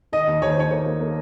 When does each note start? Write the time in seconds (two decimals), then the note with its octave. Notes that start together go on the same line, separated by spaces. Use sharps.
0.12 D#3 D#5
0.27 D#2
0.42 D#2 C#5
0.51 C5
0.57 D#2 C#5
0.71 A#3 C#5
0.86 A#3
1.00 A#3